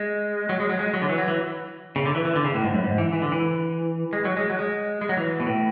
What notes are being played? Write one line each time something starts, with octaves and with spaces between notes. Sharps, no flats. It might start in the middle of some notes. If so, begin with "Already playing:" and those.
Already playing: G#3
F#3
G#3
F#3
G#3
F#3
D3
E3
F#3
E3
C#3
D3
E3
E3
D3
C#3
A2
G#2
F#2
G#2
E3
E3
D3
E3
G#3
F#3
G#3
F#3
G#3
G#3
F#3
E3
B2
A2